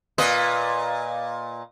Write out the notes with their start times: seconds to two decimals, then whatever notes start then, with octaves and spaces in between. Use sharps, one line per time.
0.18 A#2 B4 D#5